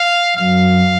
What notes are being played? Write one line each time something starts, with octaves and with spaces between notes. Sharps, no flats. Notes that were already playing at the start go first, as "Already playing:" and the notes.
Already playing: F5
F#2 F#3 F5